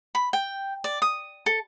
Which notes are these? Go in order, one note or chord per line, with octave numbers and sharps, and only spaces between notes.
B5
G5
D5
D#6
A4